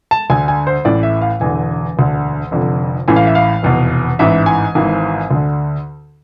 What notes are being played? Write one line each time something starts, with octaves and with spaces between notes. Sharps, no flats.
A5
D2 D3 G#5
G#5
C5
A1 A2 E3 D5
E5
F5
E1 E2 D3 G#5
E1 D2 D3
F1 F2 D3
A1 A2 E3 G#5
F5
E5
F5
F1 E2 B2
A1 G#2 E3 E5
G#5
G#1 G#2 E3
D2 D3